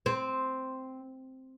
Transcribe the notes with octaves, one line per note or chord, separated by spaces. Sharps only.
C4